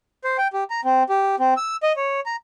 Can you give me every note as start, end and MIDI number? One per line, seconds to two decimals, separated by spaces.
0.24 0.37 72
0.38 0.48 79
0.53 0.64 67
0.70 0.81 82
0.85 1.03 60
1.09 1.36 67
1.39 1.54 60
1.57 1.76 88
1.83 1.93 75
1.96 2.20 73
2.26 2.36 82